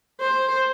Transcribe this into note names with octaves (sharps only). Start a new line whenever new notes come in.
C5